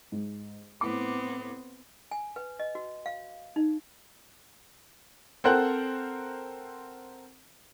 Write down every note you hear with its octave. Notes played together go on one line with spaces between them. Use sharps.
G#2
A2 B3 C4 D6
G#5
B4
D#5
F#4
F5
D#4
C4 A4 A#4 C5 F#5 F#6